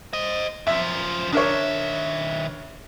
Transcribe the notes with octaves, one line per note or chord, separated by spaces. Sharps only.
C5 D#5
F#2 F3 E5
D#3 D4 A#4 C#5 E5